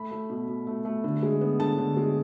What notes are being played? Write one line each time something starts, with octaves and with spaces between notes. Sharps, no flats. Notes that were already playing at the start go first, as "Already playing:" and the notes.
Already playing: A3 B5
A3
B2
B2
A3
A3
D3
G#3
B3
D3 A5
D3
G#3